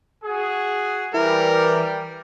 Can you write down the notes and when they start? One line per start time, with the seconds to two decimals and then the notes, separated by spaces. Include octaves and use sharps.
0.24 F#4 G#4
1.14 E3 G3 A#4